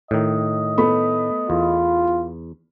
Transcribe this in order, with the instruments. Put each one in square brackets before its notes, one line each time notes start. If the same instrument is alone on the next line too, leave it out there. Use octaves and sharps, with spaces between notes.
[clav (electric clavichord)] A2 D#3 [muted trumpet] D#5
[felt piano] A3 B3 B5
[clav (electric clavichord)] E2 [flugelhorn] F4